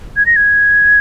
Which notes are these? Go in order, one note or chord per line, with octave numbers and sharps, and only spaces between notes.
G#6
A#6
G#6